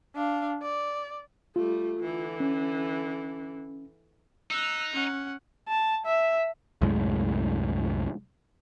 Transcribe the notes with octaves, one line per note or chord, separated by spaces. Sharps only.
D4 F5
D5
G3 A3 F4
D3 E3
C#4
D#4 E6 F#6
C#4 F#5
A5
E5
C2 F#2 A2 G#3